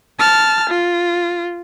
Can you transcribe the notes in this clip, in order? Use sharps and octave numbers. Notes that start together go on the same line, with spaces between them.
A5 F6
F4